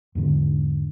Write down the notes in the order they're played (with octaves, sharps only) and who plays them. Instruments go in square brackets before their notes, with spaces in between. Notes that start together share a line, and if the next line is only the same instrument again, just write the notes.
[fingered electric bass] E2 G#2 D3